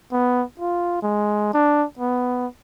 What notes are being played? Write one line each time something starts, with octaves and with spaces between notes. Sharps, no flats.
B3
F4
G#3
D4
B3